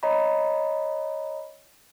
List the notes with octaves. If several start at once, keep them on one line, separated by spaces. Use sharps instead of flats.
C#5 D#5 A#5 B5